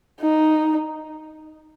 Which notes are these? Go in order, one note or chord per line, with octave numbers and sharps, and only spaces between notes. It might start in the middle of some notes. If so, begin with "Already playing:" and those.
D#4